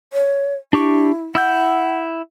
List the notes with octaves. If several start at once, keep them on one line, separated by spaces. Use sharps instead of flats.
C#5
D4 E4 G4 C#6
E4 F#5 E6 G6